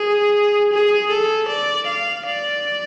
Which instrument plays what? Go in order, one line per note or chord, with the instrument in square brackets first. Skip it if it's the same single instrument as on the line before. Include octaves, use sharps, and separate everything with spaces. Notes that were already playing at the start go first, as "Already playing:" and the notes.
Already playing: [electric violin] G#4
G#4
A4
D5
F5
D5